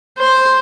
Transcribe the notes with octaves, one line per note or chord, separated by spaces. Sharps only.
C5